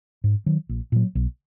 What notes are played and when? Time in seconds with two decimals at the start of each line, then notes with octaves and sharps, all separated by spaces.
0.24 G#2
0.46 D#3 F#3
0.69 A#1
0.92 A#2 F#3
1.15 B1